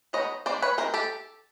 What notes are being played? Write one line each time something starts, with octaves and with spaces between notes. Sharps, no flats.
G#3 B3 D#4 C#5 D#5
D#3 G#3 C4 C5 D5
B4 C#5
D#3 G#3 C4 A#4 C5
G4 A4